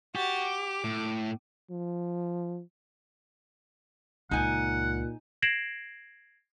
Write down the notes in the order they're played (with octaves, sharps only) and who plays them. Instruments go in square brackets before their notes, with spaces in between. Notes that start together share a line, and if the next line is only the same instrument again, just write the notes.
[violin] F#4 A6 [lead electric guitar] G4
[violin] D6
[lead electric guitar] A2
[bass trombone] F3
[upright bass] C#2 [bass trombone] A#2 [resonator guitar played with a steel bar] D#4 G#5 [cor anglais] F#5
[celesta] G#6 A#6 C7 D7 E7 F#7